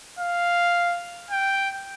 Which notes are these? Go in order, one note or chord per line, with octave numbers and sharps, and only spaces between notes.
F5
G5